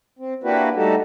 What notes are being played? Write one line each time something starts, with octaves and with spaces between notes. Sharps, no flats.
C4
A#3 D4 E4 F#4 G4 B4
G3 A3 D#4 F#4 G4 A4